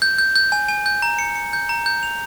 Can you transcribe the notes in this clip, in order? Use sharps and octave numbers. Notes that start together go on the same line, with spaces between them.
G6
G6
G6
G#5
G#5
G6
A#5
C#7
C#7
G6
A#5
G6
F7